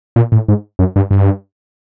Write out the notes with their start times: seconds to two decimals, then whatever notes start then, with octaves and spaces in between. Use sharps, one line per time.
0.16 A#2
0.32 A2
0.48 G#2
0.79 F#2
0.96 G2
1.11 G2